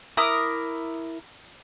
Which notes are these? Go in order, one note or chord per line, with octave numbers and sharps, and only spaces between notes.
E4 A#4 D6 D#6